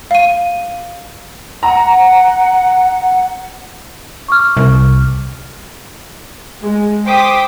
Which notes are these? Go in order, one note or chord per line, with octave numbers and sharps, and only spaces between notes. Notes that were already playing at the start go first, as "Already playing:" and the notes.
F5 D#7
F#5 A#5
C#6 D6 F6
C2
G#3
C5 G5 D6 D#6 B6